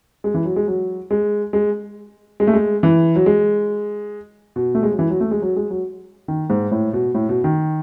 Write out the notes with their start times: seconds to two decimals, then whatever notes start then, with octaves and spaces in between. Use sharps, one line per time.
0.24 G#3
0.34 E3
0.45 F#3
0.56 G#3
0.68 F#3
1.11 G#3
1.53 G#3
2.40 G#3
2.47 A3
2.54 G#3
2.83 E3
3.16 F#3
3.26 G#3
4.56 B2
4.75 A3
4.83 G#3
4.91 F#3
4.99 E3
5.10 F#3
5.20 A3
5.31 G#3
5.42 F#3
5.56 G#3
5.70 F#3
6.28 D#3
6.50 G#2
6.72 A2
6.93 B2
7.15 A2
7.29 B2
7.44 D#3